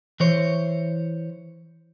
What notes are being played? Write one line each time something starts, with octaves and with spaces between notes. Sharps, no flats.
E3 C5 C#5